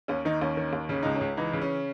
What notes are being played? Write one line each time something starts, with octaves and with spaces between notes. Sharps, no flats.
D#2 C#4
D#3 D#4
D#2 C#4
D#3
D#2
C#3 C#4
C#2 D#4
C#4
C#2
E3 D#4
C#3
C#4